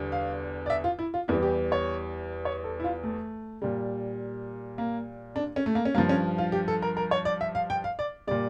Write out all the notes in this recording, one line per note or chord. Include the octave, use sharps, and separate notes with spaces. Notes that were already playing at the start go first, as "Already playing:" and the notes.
Already playing: E2 D3 G3
F5
D5
E5
F4
E4
F4
E2 E3 G3 E4
G4
C#5
C#5
A4
E4
F4
A3
A#2 G3
A#3
D4
C#4
A3
A#3
C#4
G2 F3 A#3
C#4
F4
G4
A4
A#4
A#4
C#5
D5
E5
F5
G5
F5
D5
A#2 G3 D5